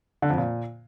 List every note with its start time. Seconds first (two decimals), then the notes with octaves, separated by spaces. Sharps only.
0.22 D3
0.30 F2
0.38 A#2